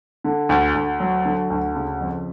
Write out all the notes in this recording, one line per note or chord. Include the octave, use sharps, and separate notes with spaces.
D3
D2
D2
F#3
D3
D2
C#3
F2